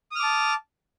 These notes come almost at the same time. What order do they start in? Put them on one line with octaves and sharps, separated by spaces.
D#6 F6 D6 A5